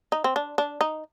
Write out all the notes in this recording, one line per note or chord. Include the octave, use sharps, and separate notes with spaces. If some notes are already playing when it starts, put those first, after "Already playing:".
D#4
C4
D4
D4
D#4